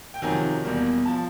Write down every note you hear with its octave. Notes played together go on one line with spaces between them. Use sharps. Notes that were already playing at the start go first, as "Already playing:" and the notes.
G5
F2 C3 D#3 F#3 G#5
E2 B2 G3 A#3
F3 A5